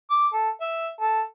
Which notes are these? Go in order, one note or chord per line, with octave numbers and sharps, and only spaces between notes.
D6
A4
E5
A4